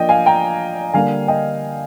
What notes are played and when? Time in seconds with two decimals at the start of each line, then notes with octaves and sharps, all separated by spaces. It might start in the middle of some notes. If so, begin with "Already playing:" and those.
Already playing: F3 A#3 D4 D5 D#5 G5
0.09 F5 G#5
0.26 G5 A#5
0.94 D3 G3 A#3 D4 F5 G#5
1.28 D#5 G5